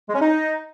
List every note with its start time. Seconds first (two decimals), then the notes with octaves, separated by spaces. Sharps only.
0.09 G#3
0.15 C#4
0.21 D#4